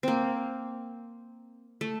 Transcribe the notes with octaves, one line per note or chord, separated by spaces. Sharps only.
A#3 C4
A3